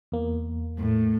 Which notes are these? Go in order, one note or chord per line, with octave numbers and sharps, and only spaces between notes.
E2 A#3
A2